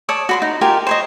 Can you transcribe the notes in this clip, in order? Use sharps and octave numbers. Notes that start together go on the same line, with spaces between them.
C#5 D5 A5 D#6
F#4 B5 C6
D#4
F4 G4 A#4 G#5
C5 C#5 D#5